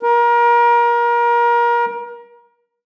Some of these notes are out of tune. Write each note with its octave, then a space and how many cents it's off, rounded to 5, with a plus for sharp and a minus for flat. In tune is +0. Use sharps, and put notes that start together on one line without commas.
A#4 +30